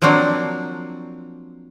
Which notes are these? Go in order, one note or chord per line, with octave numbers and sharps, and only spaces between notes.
F3 F#3 A#3 C4 D4